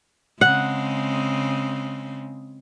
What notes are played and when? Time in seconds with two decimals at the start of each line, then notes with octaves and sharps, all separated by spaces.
0.41 C#3 G#3 C4 F#5